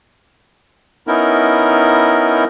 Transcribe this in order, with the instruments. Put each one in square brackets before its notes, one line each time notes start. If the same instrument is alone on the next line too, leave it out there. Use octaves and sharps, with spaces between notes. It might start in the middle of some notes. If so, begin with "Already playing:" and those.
[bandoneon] B3 C#4 D#4 E4 A#4